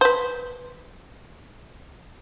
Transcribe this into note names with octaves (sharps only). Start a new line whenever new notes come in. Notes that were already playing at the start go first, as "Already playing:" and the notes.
B4 C5